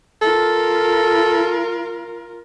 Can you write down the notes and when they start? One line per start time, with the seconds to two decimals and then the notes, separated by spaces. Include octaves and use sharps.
0.22 F4 A4 A#4